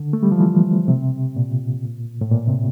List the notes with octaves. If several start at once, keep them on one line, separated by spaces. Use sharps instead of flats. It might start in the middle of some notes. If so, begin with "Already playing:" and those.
Already playing: D3
A3
G3
F3
E3
C3
A#2
A2
A#2
C3